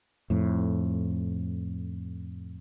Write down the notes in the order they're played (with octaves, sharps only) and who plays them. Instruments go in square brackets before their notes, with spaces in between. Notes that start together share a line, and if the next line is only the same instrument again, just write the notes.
[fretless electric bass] F2 A2